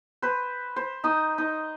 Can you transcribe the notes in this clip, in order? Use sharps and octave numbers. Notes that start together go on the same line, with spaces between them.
B4 C5
C5
D#4 D#6
D#4